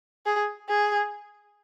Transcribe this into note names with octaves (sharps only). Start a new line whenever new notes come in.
G#4
G#4